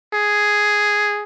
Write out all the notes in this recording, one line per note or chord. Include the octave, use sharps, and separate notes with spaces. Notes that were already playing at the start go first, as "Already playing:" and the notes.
G#4